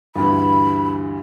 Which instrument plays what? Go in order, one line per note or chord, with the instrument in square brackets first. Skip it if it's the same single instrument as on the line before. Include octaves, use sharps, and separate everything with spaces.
[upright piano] D2 G2 E3 [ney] B5